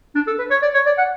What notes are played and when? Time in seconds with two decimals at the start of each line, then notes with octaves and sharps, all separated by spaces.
0.15 D4
0.27 A4
0.39 B4
0.51 C#5
0.62 D5
0.74 C#5
0.86 D5
0.98 F#5